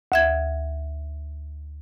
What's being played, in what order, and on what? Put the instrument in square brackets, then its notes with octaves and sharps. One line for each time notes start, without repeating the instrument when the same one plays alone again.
[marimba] D2 E5 G#6